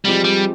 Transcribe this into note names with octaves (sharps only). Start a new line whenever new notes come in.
F3 G3 G#3 C4 G4
G3